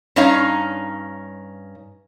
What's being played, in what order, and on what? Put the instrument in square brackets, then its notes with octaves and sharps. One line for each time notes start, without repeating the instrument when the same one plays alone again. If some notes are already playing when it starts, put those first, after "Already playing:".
[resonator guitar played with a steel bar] G2 C#4 D#4 C#5 F5 A#5